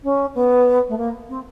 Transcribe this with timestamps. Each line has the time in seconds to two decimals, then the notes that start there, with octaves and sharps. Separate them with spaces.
0.03 C#4
0.34 B3
0.88 A3
0.97 A#3
1.28 C4